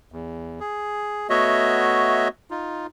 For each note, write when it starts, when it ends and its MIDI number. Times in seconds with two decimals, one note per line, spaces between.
0.12 0.60 40
0.60 1.27 68
1.30 2.28 57
1.30 2.28 59
1.30 2.28 66
1.30 2.28 73
1.30 2.28 75
1.30 2.28 76
2.51 2.87 63
2.51 2.87 65